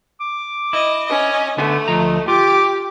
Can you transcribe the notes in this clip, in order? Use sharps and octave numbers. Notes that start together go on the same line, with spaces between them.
D6
E4 D#5
C#4 D#5
D3 A3 B3
D2 F3 D#5 A#5
F4 G4 D6